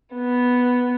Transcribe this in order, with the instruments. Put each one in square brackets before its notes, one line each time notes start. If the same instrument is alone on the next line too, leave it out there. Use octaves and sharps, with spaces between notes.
[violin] B3